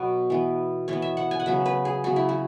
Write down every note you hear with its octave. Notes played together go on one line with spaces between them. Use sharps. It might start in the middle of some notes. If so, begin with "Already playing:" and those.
Already playing: B2 F#3 B3 F#5
E3 B3
E3 B3 C#5
E5
F#5
G#5
F#5
C#3 F#3 B3 E5
B4
G#4
C#3 F#3 B3 F#4
E4
F#4